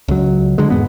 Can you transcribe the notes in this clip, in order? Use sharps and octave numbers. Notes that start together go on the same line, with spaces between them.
C#2 F#3
D3 G#3
E2 G#2 B3